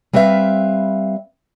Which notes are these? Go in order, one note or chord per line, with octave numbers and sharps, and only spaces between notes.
G3 C4 B4 C5 E5 F5